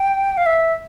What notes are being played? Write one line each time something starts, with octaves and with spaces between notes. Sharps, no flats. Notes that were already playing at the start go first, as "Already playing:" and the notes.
Already playing: G5
F5
E5